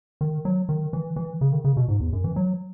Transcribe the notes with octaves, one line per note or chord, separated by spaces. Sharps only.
D#3
F#3
D#3
E3
E3
C#3
D#3
C#3
B2
G#2
E2
F#2
E3
F#3